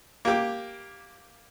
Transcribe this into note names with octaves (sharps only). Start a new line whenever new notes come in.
A#3 G4